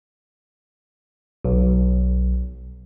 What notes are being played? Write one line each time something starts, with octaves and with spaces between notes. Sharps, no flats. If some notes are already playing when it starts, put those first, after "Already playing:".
B1